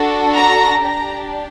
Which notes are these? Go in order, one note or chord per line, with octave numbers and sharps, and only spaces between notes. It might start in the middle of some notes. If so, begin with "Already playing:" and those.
Already playing: D4 F#4 A4
A#5
D4 G4 A#5